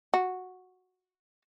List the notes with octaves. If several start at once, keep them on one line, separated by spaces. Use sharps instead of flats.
F#4